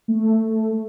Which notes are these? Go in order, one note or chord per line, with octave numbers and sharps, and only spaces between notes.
A3